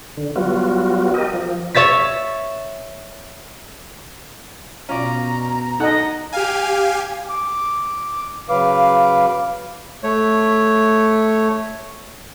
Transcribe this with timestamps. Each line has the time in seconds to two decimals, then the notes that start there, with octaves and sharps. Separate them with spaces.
0.17 D3
0.36 F#3 G3 B3 F4 F#4
1.14 G4 A#4 D#5
1.33 F3
1.75 C#5 E5 A6 B6
4.89 B2 C#4 F4 D5 A#5
5.80 D#4 A4 D#5 F#5
6.32 G4 F5 G#5
7.29 D6
8.49 C#3 F#3 B4 F5 D6
10.03 A3 C#5